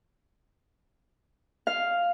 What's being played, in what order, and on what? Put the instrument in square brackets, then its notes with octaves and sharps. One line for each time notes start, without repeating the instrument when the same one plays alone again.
[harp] F5